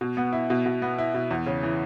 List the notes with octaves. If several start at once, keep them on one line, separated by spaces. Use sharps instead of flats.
B2
B3
E4
B2
B2
B3
E4
B2
E2
C#3
E3